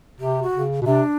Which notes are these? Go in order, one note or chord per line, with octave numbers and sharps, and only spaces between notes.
C3 G4
F#4
C#3
B2
C3 D4